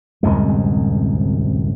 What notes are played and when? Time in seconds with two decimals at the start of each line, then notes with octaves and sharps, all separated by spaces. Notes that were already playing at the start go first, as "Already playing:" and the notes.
0.23 D1 C2 F#2 G#3